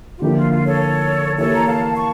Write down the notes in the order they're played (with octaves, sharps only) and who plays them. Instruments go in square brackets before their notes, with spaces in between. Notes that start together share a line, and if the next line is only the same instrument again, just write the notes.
[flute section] F4
[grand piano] D3 F3 A#3 E4 [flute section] G4
[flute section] F4
F4
A4 C#5
[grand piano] E3 A#3 E4 G4 [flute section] A4 C#5
[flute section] A#5
F5 A5
A5 C#6